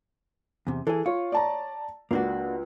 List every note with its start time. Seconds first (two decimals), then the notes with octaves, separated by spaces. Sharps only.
0.67 E2 C3
0.87 E3 G#4 A4
1.06 F4 C#5
1.32 D5 A5 A#5
2.11 C#2 A#3 D4 F#4